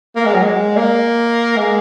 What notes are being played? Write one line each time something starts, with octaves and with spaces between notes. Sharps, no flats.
A#3
G#3
F#3
G#3
A#3
G#3